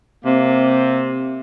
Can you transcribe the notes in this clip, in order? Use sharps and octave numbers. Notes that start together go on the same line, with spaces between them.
C3 A#3 C4